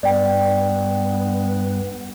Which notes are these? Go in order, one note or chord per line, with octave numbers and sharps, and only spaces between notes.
G2 B3 D5 G5